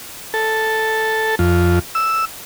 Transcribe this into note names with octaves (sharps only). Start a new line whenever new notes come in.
A4
F2
E6